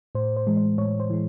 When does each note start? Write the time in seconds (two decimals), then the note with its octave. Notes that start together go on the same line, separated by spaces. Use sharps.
0.15 A2 C5
0.37 C5
0.47 E3 G#3
0.57 C5
0.78 A2 C#5
1.00 C5
1.10 E3 G#3